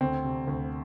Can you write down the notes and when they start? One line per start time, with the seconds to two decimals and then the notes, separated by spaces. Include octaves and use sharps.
0.01 D2 C4
0.24 C3
0.47 D2